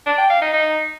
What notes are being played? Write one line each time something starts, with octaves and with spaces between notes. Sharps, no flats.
D4
G5
F5
D#4
D#4